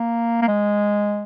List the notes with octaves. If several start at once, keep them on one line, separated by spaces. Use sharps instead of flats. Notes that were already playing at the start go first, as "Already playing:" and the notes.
Already playing: A#3
A#3
G#3